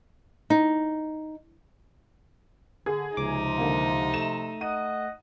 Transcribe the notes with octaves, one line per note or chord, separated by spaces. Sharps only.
D#4
D3 G#4
C#2 C3 F3 D#4 D6
D3 A#3
A3 E7
D#5 F#5 D#7